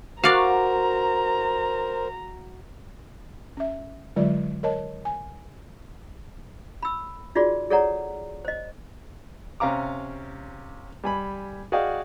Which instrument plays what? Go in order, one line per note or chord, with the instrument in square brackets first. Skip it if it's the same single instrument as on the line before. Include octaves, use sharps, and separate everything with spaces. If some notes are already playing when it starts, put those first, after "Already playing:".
[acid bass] F#4 [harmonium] A#4 C5 [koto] D5 F5 [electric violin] A#5
[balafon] C#4 E5
D3 F#3 G#3 F4 D5 E5
A#4 C#5 D#5 A5
G#5
[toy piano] B5 E6
D#4 F4 F#4 G#4 D5
G#4 A4 C#5 D5 F#5 A#5
C5 D#5
[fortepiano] C3 C#4 F5 A#5 D6
G3 G#5 B5
F#4 G#4 D5 D#5 F5 G5